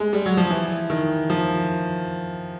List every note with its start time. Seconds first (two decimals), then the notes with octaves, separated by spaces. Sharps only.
0.00 G#3
0.13 G3
0.26 F#3
0.37 F3
0.50 E3
0.90 D#3
1.30 F3